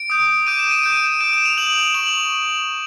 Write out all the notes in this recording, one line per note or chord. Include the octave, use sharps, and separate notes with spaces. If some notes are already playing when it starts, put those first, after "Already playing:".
Already playing: D7
D#6 G6
D6 G6 D#7
E7
D#7
D6 G6 D7
D#6 G6 D#7
E7
F7
D#6 G6 F#7
C#6 F#7